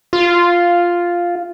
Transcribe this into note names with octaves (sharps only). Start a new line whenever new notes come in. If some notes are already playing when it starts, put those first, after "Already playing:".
F4